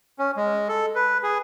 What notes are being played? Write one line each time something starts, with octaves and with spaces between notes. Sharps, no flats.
C#4
G#3
A4
B4
G#4